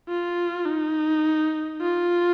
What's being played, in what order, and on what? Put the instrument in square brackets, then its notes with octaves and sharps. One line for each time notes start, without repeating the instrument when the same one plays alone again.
[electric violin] F4
D#4
F4